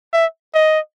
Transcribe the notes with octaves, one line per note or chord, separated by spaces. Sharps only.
E5
D#5